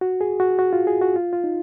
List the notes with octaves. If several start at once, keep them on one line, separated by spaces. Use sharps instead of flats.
F#4
G#4
F#4
F#4
F4
G#4
F#4
F4
F4
D#4